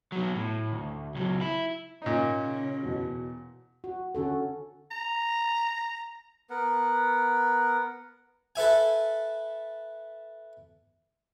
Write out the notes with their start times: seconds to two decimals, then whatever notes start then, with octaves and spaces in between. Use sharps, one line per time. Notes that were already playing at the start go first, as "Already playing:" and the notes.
0.12 B2 F#3
0.35 A2
0.72 D2
1.15 C#2 F#3
1.41 E4
2.02 A#2 C#3 C#4 D#4
2.83 E2 B2
3.84 F#4
4.15 D3 C#4 F#4 A4
4.91 A#5
6.50 B3 A#4 F#5
8.56 A4 B4 E5 G#5